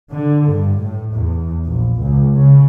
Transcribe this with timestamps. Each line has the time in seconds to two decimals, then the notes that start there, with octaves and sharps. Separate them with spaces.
0.11 D3
0.50 G2
0.79 A2
1.15 E2
1.65 A#1
2.00 C#2
2.36 C#3